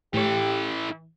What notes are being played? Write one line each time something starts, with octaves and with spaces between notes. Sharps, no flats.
A2 E3 G4 A4 C#5